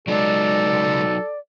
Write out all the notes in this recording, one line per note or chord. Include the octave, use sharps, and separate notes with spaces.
C#2 F#3 G#3 D#4 A4 D5